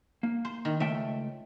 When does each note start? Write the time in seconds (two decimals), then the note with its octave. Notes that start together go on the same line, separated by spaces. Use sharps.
0.23 A#3
0.45 C5
0.65 D#3
0.80 C#2 A3 E5 G5